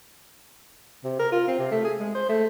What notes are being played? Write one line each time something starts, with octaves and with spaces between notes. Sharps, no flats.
C3
A#4
F4
C4
C3
A3
G#4
G#3
C5
A3